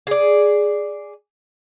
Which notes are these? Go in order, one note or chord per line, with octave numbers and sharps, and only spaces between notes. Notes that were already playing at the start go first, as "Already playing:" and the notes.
G#4 D5